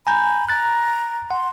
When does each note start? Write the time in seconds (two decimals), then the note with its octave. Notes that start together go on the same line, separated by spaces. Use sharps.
0.07 G#5 A#5 B5 G6
0.49 A#5 F#6 A6
1.31 F#5 C6